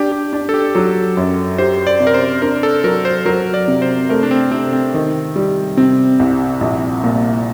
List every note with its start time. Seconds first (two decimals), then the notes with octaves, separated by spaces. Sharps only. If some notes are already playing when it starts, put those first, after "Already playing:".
Already playing: D4 G4
0.12 G4
0.33 D4
0.49 A4
0.54 G4
0.75 F#3 A4
1.17 F#2
1.58 G4 C5
1.87 D5
2.00 C3
2.07 A#4
2.14 C5
2.42 D4 A#4
2.63 A4
2.84 F#3 A#4
3.05 C5
3.25 F#3 A#4
3.54 D5
3.68 C3
3.82 C5
4.09 A3 A#4
4.23 D4
4.31 C4
4.51 C3 C4
4.73 C4
4.94 D#3
5.36 G3
5.77 C3 C4
6.20 C2
6.61 A#1
7.04 A#2